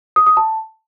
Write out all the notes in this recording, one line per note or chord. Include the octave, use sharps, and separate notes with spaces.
D#6
D#6
A5